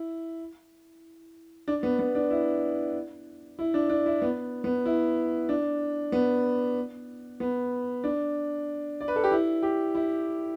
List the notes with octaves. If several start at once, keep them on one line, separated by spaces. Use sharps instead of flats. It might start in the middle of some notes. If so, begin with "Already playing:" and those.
Already playing: E4
D4
B3
B3
D4
E4
E4
D4
D4
E4
B3
B3
E4
D4
B3
B3
D4
D5
B4
A4
G4
E4
G4
E4